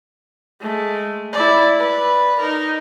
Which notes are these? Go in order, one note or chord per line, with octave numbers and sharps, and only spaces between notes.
G#3 A3
E4 D5
B4 D5
D#4 A#4